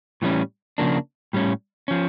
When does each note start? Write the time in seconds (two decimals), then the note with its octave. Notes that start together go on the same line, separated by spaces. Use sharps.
0.22 A2 E3 G3 C#4
0.78 C#3 F3 A#3 D4
1.33 A2 G3 C#4
1.88 F3 C#4